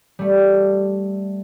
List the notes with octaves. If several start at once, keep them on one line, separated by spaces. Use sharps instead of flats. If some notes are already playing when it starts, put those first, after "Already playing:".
G3 A3